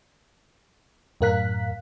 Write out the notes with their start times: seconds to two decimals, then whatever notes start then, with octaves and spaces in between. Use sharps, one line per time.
1.21 F#2 A2 A#4 F5 F#6 B6